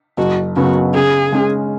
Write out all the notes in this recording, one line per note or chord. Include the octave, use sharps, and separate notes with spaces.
F#1 F#4
F#2 C#3 F#3 B3 F#4
C#3 G#4
G#3 C#4